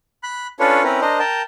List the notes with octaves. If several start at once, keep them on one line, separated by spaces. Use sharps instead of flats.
B5 F#6
C#4 D4 F4 A4 B4 C#5
C4 C#4 E4 A#4 B4
D4 A#4 C5 D#5
A#4 G5 A5